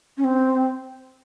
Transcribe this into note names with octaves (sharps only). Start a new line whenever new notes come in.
C#4
C4